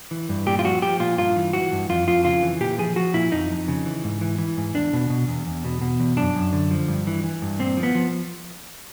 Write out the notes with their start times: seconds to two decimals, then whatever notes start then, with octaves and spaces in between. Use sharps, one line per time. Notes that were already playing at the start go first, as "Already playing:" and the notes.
0.11 E3
0.29 G2
0.46 A#2 G4
0.59 F4
0.64 F3 F#4
0.82 F3 G4
1.00 A#2 F4
1.18 G2 F4
1.36 E3
1.53 E3 F#4
1.72 G2
1.89 F2 F4
2.07 F2 F4
2.25 C#3 F4
2.43 E3
2.61 A#2 G4
2.78 F3 G#4
2.96 F3 F#4
3.14 A#2 E4
3.32 F2 D#4
3.51 F2
3.68 C#3
3.86 E3
4.04 G#2
4.21 E3
4.38 E3
4.57 G#2
4.75 E2 D4
4.93 B2
5.10 B2
5.28 E2
5.46 E2
5.64 B2
5.81 B2
6.00 E2
6.17 F#2 D4
6.36 F#2
6.53 D3
6.71 F3
6.88 G2
7.07 E3
7.24 E3
7.42 G2
7.59 A#2 C4
7.77 F3
7.83 B3
7.95 F3